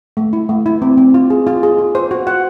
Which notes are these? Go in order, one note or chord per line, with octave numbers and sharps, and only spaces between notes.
A3
E4
A3
E4
C4
C4
F4
G#4
F4
G#4
F4
C5
F#4
F#5